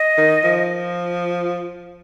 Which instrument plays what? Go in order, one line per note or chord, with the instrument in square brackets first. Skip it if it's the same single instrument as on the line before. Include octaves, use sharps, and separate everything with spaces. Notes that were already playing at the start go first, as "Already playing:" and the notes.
Already playing: [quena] D#5
[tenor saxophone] D#3
F3